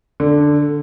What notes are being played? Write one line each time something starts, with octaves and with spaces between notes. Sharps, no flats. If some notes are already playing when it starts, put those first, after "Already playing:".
D3